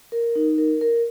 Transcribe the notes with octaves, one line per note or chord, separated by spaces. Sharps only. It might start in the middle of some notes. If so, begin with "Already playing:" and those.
A#4
D#4
A#4
A#4